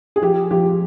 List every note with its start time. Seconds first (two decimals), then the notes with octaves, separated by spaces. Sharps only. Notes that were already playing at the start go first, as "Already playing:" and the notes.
0.16 G#4
0.22 F3 G4
0.51 F3 G4